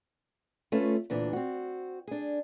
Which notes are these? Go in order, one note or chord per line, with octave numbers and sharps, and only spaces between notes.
A3 C#4 F4 B4
D2 A#2 E3 D4
C4 F#4
D4 G#4